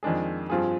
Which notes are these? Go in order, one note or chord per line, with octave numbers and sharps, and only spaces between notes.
F2 D#3 G#3 D4 G#4
G2 F3 C4 F4 G#4